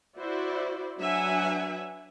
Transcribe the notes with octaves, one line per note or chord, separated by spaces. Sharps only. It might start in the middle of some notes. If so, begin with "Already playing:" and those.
E4 F#4 C5 D5
F#3 D4 B4 E5 F#5 G#5